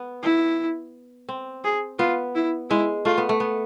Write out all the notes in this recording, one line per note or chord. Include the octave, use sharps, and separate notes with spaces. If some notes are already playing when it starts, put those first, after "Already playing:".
Already playing: B3
E4
C4
G#4
B3 F4
E4
G#3 E4
A3 F4
B3
A3
B3